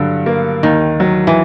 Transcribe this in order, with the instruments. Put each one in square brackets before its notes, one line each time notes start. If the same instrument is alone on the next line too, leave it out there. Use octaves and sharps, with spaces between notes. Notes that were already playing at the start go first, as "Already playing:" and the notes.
Already playing: [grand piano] G2 D3 F#3
A#3
[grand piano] D#2 [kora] D#3
[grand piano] F#3
[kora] E3